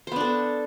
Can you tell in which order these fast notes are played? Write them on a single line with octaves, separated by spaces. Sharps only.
C5 B3 D4 A4